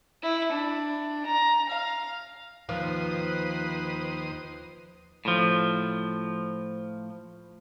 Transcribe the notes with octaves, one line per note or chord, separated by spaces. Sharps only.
E4
D4
A#5
F5
D#2 F3 B4 C5 D#6
A2 F3